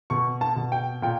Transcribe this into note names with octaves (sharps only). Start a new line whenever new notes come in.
B2 C#6
A5
B2
G5
A#2 G5